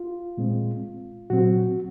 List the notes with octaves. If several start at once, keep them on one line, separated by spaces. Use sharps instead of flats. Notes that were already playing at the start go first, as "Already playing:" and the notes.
Already playing: F4
A#2 G#3 C4
A#2 F#3 C4 F#4